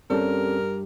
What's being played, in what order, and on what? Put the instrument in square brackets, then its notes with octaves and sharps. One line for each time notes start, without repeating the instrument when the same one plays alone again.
[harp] G2 [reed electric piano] C4 C#4 A4 [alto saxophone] A#4